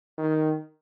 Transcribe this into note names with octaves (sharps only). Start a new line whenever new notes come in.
D#3